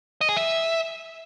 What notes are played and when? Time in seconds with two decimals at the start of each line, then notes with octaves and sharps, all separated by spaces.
0.21 D#5
0.29 G#4
0.36 E5